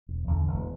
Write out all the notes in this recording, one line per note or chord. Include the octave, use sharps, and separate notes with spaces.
E1
E2 D3
E1